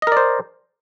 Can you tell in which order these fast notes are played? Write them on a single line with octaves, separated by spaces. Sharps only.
D#5 A#4 D5 C5